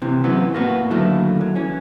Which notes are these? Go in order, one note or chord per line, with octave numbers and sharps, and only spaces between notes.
C3 E3
C#3 E3 F#3 B3 C4
A2 A#3 B3 F#4
D3 D#3 F#3 A3 A#3 E4
F#3
E3 C#4